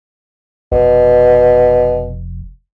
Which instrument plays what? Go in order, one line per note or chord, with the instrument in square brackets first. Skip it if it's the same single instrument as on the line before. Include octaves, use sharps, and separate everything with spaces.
[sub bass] F1 [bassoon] B2